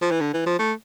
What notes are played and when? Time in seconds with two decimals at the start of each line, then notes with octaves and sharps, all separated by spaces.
0.02 F3
0.11 E3
0.21 D3
0.34 E3
0.46 F3
0.59 A3